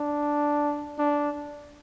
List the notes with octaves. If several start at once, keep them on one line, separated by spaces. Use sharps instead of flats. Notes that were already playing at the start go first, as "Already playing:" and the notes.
Already playing: D4
D4